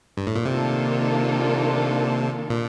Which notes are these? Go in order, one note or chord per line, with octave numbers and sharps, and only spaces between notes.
G2
A2
A#2
C3 D#3 A#3 D4 F4 A4
A#2